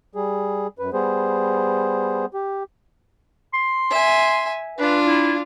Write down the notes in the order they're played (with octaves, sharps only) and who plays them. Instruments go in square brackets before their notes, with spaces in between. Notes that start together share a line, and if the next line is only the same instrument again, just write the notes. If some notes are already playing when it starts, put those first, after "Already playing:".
[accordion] G3 G#4
F#2 B4
G3 B3 G#4 C5
G4
[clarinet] C6
[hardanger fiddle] E5 G#5
[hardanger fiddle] D4 F4 [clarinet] B4
[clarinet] E4